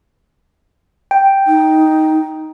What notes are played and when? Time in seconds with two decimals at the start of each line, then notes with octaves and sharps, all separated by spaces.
1.11 G5
1.47 D#4